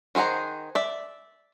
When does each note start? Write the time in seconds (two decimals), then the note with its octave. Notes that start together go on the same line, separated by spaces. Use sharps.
0.15 D#3 G#4 C5 F#5 A#5
0.75 D5 E5